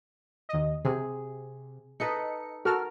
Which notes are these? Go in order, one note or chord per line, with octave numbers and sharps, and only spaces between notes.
D#2 D#5
C3 G#4
D#4 A4 B4 D#5 C#7
F#4 A4 A#4 F6